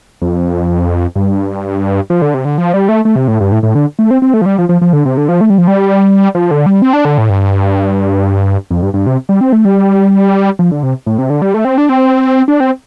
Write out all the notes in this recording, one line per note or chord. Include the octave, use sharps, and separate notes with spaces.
F2
G2
F3
D3
C3
D3
F3
G3
A3
A3
C3
A2
G2
A2
A2
D3
A3
C4
C4
A3
F3
G3
F3
F3
F3
D3
C3
D3
F3
A3
G3
F3
G3
F3
D3
G3
C4
D4
D3
A2
G2
F2
G2
G2
C3
G3
C4
A3
G3
F3
D3
C3
A2
C3
D3
G3
A3
C4
D4
C4
D4
C4